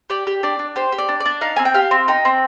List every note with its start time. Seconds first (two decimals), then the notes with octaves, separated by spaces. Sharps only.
0.10 G4 D5
0.27 G4
0.43 D4 D5
0.59 D4
0.76 G4 C5
0.92 G4
0.98 D5
1.09 D4
1.20 D5
1.25 D4
1.41 D#4 F5
1.56 C4 G#5
1.65 G5
1.74 G4 F5
1.91 C4
2.08 D#4 G5
2.25 C4